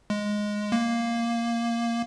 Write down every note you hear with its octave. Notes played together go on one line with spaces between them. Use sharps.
G#3
A#3